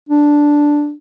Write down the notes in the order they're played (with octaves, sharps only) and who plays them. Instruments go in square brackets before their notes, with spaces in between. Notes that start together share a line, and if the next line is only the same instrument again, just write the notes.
[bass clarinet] D4